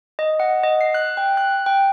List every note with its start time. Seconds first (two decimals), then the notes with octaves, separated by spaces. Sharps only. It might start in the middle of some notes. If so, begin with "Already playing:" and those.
0.19 D#5
0.40 F#5
0.63 D#5
0.81 C7
0.94 F#6
1.17 G5
1.37 F#6
1.66 G5